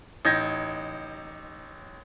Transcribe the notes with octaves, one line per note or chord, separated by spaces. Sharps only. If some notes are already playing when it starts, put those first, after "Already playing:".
A1 D#4 G6 G#6 A#6